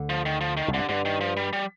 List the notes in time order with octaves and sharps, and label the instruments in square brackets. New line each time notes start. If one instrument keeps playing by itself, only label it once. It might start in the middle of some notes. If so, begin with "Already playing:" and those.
Already playing: [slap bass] D2 D3
[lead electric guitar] F3
D#3
F3
D#3
[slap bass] C2 C3
[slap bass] G2 [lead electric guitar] D3
[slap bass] G2 [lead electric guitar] D3
[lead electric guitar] D#3
F3
G3
G3